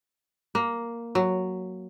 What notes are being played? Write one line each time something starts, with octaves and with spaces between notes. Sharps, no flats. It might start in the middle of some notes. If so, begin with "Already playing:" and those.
A#3
F#3